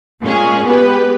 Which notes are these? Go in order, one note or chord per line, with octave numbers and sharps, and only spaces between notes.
A#2 G#3 C#4 G#4
G#3 B3 G4 B4